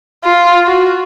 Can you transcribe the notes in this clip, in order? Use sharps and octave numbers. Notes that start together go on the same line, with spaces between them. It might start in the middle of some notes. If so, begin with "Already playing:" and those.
F4
F#4